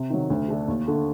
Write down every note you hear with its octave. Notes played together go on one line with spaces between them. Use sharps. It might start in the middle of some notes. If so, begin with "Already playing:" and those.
Already playing: C3
D#3 F#3
D2
D3 A3 D4 A4
D#2
D3 A3